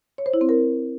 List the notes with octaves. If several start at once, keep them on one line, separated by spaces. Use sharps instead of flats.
C#5
C5
E4
C4
A#4